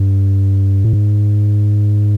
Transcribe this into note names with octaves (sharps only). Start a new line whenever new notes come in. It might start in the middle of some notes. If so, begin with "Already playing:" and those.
Already playing: G2
A2
G#2